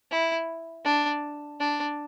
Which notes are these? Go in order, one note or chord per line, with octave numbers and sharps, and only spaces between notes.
E4
D4
D4